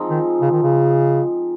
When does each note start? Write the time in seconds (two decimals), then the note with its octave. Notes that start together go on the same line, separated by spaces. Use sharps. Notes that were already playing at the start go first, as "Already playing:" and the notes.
Already playing: F3 G#3 C4 D#4
0.10 D#3
0.41 C#3
0.52 D#3
0.63 C#3